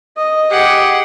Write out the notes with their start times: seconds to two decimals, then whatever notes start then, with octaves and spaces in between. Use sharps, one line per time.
0.17 D#5 D#6
0.51 G4 G#4 F#5